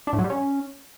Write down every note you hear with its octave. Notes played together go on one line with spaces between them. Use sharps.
D4
A2
F#3
G3
C#4